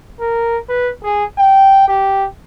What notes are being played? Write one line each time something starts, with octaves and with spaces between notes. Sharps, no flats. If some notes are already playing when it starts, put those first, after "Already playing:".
A#4
B4
G#4
G5
G4